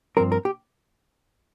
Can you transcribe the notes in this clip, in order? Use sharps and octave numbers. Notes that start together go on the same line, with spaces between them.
G2 F3 C4 A#4
A#4
G4